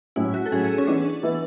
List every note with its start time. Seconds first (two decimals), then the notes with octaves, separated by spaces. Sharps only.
0.16 A2 F#3 C#4 E4
0.34 F#4
0.46 A4
0.51 A2 F#3 C#4 G#4
0.78 C#4
0.87 E3 B3 D4 E4
1.23 E3 B3 E4